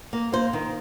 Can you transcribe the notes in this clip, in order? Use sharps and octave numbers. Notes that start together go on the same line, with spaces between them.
A#3
A#3 C5
D#3